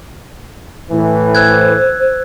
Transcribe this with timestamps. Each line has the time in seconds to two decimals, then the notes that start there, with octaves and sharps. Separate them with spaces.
0.91 A2 E3
1.35 C5 E6 F#6 G#6